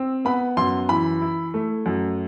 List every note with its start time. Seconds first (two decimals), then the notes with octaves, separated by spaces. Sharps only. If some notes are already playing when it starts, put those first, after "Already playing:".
Already playing: C4
0.25 B3 B5
0.57 F#2 C6
0.89 E3 B5
1.22 E4
1.54 A3
1.86 F#2